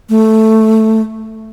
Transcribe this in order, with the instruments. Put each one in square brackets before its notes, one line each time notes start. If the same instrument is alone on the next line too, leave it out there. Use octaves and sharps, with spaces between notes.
[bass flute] A3